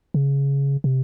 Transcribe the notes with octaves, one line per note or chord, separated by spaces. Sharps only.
C#3
C3